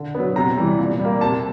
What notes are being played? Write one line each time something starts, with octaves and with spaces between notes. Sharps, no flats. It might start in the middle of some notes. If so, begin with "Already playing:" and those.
Already playing: D3
F#3 B3
C3 A#5
E3 G3
A#2
G3
A#3
C3 A5